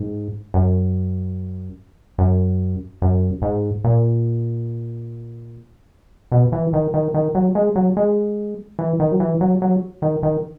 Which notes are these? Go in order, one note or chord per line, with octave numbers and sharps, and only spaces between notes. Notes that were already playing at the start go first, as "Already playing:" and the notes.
Already playing: G#2
F#2
F#2
F#2
G#2
A#2
B2
E3
D#3
D#3
D#3
F#3
G#3
F#3
G#3
E3
D#3
F#3
E3
F#3
F#3
D#3
D#3